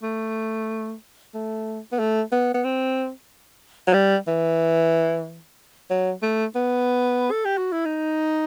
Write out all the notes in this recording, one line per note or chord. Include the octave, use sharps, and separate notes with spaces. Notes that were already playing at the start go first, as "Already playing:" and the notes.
A3
A3
B3
A3
B3
B3
C4
F#3
G3
E3
F#3
A3
B3
A4
G4
F#4
E4
D#4